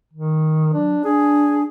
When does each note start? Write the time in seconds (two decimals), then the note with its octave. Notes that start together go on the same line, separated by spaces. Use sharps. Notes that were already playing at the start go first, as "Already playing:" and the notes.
0.13 D#3
0.73 F#3 D4
1.05 D4 G#4